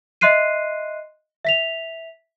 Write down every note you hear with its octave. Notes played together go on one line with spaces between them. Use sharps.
D#5 E5 C6 F#6 C7 D#7
E5 B6 F7